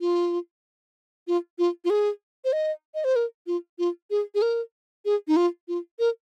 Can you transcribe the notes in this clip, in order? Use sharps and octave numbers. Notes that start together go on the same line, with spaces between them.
F4
F4
F4
F4
G#4
C5
D#5
D#5
C5
A#4
F4
F4
G#4
G#4
A#4
G#4
D#4
F4
F4
A#4